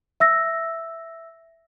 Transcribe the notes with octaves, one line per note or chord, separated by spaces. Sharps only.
E5 E6 A#6